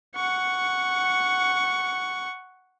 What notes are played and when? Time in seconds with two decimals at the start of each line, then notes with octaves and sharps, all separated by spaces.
0.15 F#5 C#6